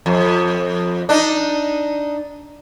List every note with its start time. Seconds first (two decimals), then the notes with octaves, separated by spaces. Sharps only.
0.06 F2
1.09 D4 D#4